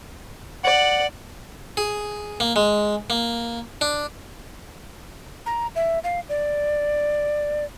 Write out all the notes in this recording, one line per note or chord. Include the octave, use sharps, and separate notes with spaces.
D5 F#5
G#4
A#3
G#3
A#3
D4
A#5
E5
F5
D5